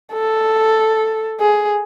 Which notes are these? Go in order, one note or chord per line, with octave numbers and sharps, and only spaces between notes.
A4
G#4